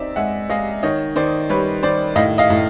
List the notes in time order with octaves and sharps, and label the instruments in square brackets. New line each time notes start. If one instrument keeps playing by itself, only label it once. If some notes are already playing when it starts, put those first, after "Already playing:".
Already playing: [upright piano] C4 D#4 D5 E5
G#3 E5 F#5
G#3 D#5 F5
D#3 C#5 D#5
D#3 C5 D5
G3 B4 C#5
D#3 C5 D5
A2 D#5 F5
D#5 F5
A2